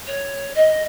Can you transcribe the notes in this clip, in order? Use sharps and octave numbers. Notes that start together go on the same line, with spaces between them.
C#5
D#5